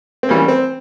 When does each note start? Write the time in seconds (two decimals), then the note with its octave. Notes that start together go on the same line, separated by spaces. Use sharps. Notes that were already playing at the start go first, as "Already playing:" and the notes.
0.23 C4
0.29 E3 G3 A#3 C#4
0.48 C4